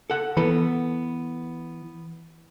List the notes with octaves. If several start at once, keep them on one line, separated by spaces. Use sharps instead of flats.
A4 F#5
E3 B3 A4 B5